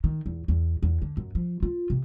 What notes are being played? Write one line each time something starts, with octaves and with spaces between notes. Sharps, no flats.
D#3
E2
E2
E2
D3
F#2
F3
F4
C3